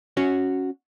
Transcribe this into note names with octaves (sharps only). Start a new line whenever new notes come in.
C#4 F#4 C#5